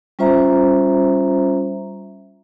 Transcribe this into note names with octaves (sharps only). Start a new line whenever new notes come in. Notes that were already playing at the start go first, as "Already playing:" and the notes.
G3 C#4 F4 C5 E5 A#5